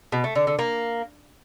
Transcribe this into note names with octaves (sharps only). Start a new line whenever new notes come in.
B2
A3
D3
D3
A#3